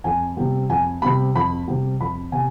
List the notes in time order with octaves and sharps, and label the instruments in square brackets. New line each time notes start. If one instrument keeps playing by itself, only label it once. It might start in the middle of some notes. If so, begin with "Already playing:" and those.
[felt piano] F2 G#5
C3 G3
F2 G#5
C3 G3 B5
F2 B5
C3 G3
F2 B5
C3 G#5